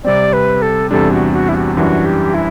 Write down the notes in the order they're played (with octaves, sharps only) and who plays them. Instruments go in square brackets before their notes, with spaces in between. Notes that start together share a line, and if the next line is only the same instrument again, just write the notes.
[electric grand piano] C3 G3 C4 [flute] D5
[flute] B4
A4
[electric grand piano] E2 C3 G3 D4 [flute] A4
[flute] F#4
F#4
E4
F#4
[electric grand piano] F#2 E3 G3 D4 [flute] F#4
[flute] G4
E4